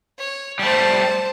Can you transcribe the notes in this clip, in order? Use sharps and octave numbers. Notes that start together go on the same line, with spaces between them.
C#5
G3 A3 C5 A5